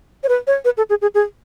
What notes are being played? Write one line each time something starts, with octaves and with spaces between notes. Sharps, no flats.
C#5
B4
C#5
B4
A4
G#4
G#4
G#4